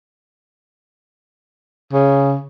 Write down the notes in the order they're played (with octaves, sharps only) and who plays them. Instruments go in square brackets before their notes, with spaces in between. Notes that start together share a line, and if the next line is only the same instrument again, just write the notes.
[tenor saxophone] C#3